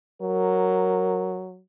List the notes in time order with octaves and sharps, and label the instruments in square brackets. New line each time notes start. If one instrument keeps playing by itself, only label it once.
[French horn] F#3 [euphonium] A#4